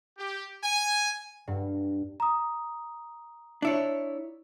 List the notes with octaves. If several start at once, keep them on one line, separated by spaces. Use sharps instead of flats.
G4
G#5
G2
A#5 D#6
D4 E4 C#5